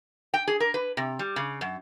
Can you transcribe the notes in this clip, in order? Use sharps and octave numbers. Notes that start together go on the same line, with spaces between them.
G5
G#4
A#4
B4
C3
G3
C#3
F#2